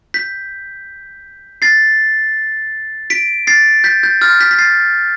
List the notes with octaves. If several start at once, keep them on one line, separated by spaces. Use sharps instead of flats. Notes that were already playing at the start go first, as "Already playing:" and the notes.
G6 B6
A6 C7
B6 D7
A6 C7
G6 B6
G6
F6 A6
G6 B6
B6
A6 C7